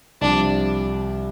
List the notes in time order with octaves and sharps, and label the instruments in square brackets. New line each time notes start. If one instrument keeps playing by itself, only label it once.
[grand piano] C2 C3 F3 [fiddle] D4